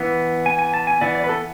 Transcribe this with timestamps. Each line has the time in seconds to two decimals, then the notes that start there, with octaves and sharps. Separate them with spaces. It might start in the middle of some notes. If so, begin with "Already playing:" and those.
Already playing: E3 B3
0.46 G#5
0.59 G#5
0.74 A5
0.87 G#5
1.01 E3 B3 D5
1.15 D5
1.24 B4
1.29 A4